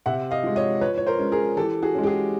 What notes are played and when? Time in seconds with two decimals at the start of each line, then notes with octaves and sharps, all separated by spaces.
0.06 C3 E5 F#5
0.31 D#5 F5
0.43 F3 G#3
0.56 C#5 D#5
0.81 F3 B4 C#5
0.98 C#5
1.07 A#4 C5
1.19 G#3 C#4
1.32 G#4 A#4
1.57 E3 G4 A4
1.82 F#4 G#4
1.95 G#3 C#4
2.03 G4
2.07 F#4 G#4